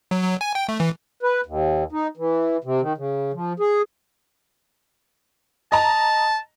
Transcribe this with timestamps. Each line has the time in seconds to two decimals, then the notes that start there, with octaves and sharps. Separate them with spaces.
0.11 F#3
0.23 F#3
0.41 G#5
0.55 G5
0.69 A3
0.80 E3
1.23 B4
1.46 D#2
1.92 D#4
2.17 E3
2.64 C3
2.81 D#3
2.97 C#3
3.34 F3
3.60 G#4
5.72 D#5 A5 A#5